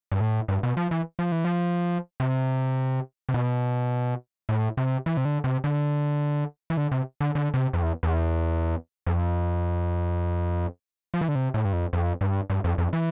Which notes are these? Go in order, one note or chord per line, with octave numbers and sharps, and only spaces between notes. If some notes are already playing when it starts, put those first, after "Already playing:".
G2
A2
G2
B2
F3
E3
F3
E3
F3
C3
C3
B2
A2
C3
E3
C3
D3
C3
D3
E3
D3
C3
D3
D3
C3
F2
E2
E2
F2
F3
E3
D3
C3
A2
G2
F2
F2
G2
G2
F2
F2
E3